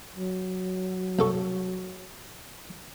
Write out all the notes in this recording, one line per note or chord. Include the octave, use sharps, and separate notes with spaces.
F#3
C2 A4 C#6